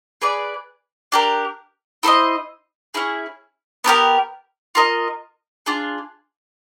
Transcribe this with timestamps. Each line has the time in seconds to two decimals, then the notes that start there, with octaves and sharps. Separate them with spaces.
0.22 G#4 B4 D5
1.12 D4 G4 A#4
2.03 E4 A4 C5 D#5
2.94 C#4 E4 G#4
3.84 B3 D4 G4 A#4
4.75 F4 A#4 D#5
5.66 D4 F4 G#4